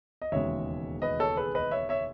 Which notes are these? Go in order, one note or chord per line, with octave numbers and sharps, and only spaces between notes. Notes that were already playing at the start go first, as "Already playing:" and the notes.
D#5
E1 D#2 C#3 G#3 C#5 E5
B4 D#5
A4 C#5
G#4 B4
B4 D#5
C#5 E5
C#5 E5